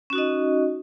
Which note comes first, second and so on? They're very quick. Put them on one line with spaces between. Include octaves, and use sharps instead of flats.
C#4 F#4 D#4 D#5